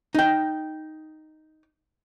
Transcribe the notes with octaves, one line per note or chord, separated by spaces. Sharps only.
D#4 G5